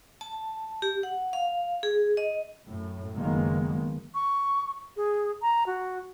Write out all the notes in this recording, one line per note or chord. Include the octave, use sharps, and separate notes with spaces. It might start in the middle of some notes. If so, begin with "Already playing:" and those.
A5
G4
F#5
F5
G#4
D#5
F#2 A2
F#1 D#3 G#3 A#3 B3
C#6
G#4
A#5
F#4